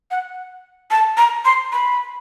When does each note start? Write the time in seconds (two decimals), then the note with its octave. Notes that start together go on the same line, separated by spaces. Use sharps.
0.11 F#5
0.91 A5
1.17 A#5
1.45 C6
1.72 B5